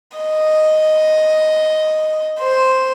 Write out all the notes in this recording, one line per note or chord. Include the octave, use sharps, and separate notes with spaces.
D#5
C5